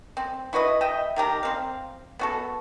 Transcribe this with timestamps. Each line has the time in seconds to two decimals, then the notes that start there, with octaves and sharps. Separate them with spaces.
0.17 C4
0.53 E4 F#4 B4 D#5
0.81 D#5 E5 G5
1.16 D#3 G4 G#4 A#5
1.43 C4 F5
2.19 B3 F#4 A4